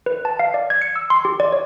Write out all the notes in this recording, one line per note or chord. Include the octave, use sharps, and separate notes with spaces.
B4
A5
F5
D5
G#6
C#7
E6
C6
G4
D5
C#5